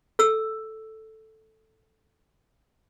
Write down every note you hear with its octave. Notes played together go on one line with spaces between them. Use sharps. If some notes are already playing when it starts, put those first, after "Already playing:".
A4 E6